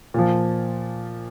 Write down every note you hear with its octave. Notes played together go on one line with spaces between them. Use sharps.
A#2 F3